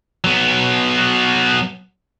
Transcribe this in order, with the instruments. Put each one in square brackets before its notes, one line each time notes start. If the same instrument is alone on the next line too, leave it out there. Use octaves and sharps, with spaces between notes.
[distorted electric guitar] F#3 B3